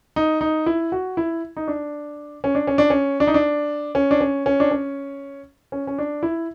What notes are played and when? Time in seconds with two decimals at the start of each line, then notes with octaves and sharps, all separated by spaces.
0.16 D#4
0.41 D#4
0.66 E4
0.92 F#4
1.17 E4
1.57 D#4
1.68 D4
2.44 C#4
2.55 D4
2.67 C#4
2.78 D4
2.90 C#4
3.20 D4
3.27 D#4
3.34 D4
3.95 C#4
4.11 D4
4.21 C#4
4.46 C#4
4.60 D4
4.71 C#4
5.72 C#4
5.87 C#4
5.98 D4
6.23 E4